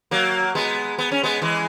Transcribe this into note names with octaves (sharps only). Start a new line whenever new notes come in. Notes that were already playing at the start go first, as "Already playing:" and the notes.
F#3 A#3
G#3 B3
B3
C#4
G#3 B3
E3 G#3